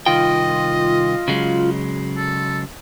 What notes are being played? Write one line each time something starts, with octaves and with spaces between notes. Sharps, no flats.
C2 D#3 F4 D#5 G5
C#3 F#3 G#3
A4